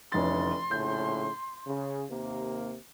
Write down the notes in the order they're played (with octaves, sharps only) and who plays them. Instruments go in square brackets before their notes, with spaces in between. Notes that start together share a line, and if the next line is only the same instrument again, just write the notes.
[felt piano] F1 A6 [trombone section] D3 E3 C#4 [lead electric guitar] C6
[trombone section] A#1 A2 C#3 [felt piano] G6
[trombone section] C#3
D#2 C3 A#3